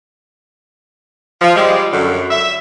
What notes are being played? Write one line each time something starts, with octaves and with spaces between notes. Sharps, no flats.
F3
G3 G#3
F#2 D3
E5